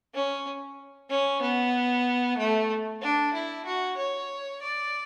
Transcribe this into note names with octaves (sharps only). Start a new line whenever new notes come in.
C#4
C#4
B3
A3
D4
E4
F#4
C#5
D5